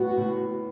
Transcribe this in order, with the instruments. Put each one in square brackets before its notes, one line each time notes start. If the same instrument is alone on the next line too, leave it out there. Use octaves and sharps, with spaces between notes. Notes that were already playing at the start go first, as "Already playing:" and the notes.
Already playing: [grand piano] A2 G3 B3 [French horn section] F#4
[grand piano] A2